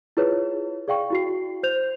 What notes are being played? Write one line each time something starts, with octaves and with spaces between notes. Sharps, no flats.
E4 F4 G#4 B4 C#5
G#4 D5 F5 G5 C#6
E4 F#4 C7
C5 G6 F7